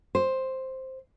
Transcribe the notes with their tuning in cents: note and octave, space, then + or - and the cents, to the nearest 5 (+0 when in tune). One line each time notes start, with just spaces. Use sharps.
C5 +5